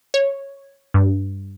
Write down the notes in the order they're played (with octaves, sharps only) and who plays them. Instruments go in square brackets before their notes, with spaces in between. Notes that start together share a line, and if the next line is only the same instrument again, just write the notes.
[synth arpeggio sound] C#5
G2